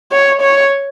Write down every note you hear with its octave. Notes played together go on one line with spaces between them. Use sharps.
C#5
C#5